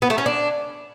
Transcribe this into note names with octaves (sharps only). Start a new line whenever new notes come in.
B3
A3
C#4
D4